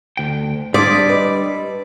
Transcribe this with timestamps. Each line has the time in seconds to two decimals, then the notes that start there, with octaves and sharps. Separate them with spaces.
0.17 D2 G5
0.74 G3 D4 D5 C6 D#6 B6
1.09 B4 D#5